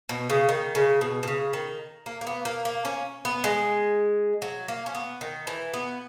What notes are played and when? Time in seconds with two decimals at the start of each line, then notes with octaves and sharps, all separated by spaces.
0.09 B2
0.30 C#3
0.49 D#3
0.75 C#3
1.01 B2
1.23 B2
1.28 C#3
1.53 D#3
2.06 A#3
2.21 A#3
2.27 B3
2.45 A#3
2.65 A#3
2.85 C#4
3.25 B3
3.44 G#3
4.42 F#3
4.68 A#3
4.86 C#4
4.95 B3
5.21 D#3
5.47 E3
5.74 B3